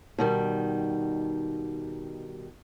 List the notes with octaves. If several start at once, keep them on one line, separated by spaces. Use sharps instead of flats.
B2 D#3 G3